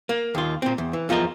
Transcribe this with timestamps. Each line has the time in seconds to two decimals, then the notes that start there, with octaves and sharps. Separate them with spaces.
0.09 A#3
0.35 D#2 F4
0.62 A#2 C4
0.78 E2
0.93 E3
1.09 E2 F3 F4 A#4 D#5